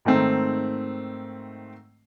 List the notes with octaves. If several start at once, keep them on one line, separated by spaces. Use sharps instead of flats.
G#2 D#3 A3 C4